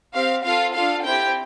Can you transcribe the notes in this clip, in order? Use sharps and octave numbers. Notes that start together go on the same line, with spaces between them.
C4 G4 F5
C4 F4 A4 F5
D4 F4 A4 F5
C4 E4 G4 G5